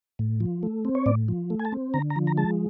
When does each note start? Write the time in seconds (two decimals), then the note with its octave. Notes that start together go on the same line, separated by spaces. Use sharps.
0.19 A2
0.40 F3
0.63 A3
0.85 C4
0.95 C#5
1.06 A2 D5
1.28 F3
1.50 A3
1.59 G#5
1.65 A5
1.72 C4
1.94 D3 A#5
2.10 A#5
2.16 F3
2.27 A#5
2.37 G#3 A5